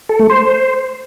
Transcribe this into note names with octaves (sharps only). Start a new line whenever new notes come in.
A4
A3
C5